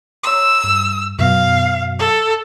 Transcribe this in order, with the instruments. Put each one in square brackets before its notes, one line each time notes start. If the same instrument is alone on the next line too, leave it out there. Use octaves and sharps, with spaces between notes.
[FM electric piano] C#5 A#5 C6 [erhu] E6
[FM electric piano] G2
[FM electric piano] F#2 B2 [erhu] F5
[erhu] A4